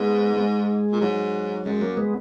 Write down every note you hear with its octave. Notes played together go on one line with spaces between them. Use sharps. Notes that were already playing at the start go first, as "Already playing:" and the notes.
Already playing: G#2 G#3 B3
G#3
A#2
G#2 F#3
F#2 G#3
F#3 A#3
G#3 B3